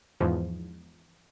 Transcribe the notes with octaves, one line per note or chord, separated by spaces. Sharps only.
E2 G#2 F3